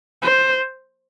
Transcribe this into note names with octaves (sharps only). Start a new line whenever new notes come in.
C5